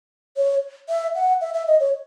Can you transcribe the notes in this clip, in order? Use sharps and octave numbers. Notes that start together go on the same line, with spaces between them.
C#5
E5
F#5
E5
E5
D#5
C#5